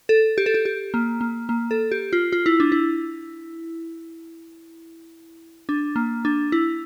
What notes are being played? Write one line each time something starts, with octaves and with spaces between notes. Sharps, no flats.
A4
G4
A4
G4
G4
A#3
A#3
A#3
A4
G4
F4
F4
E4
D4
E4
D4
A#3
D4
E4